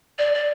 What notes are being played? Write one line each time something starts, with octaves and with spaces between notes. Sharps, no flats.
D5
D5